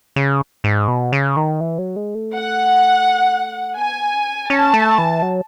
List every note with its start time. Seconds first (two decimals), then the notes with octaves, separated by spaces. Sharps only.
0.16 C#3
0.64 G#2
0.88 B2
1.12 C#3
1.37 D#3
1.60 E3
1.78 F#3
1.96 G#3
2.15 A3
2.33 F#5
3.77 B3 G#5
4.14 C#4
4.50 C#4 A5
4.74 A3
4.98 E3
5.22 F#3